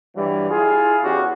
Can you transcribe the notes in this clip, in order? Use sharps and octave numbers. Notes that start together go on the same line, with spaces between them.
G2 E3 F#3 G3
E4 F4 G#4
E2 E3 C#4 F#4 G4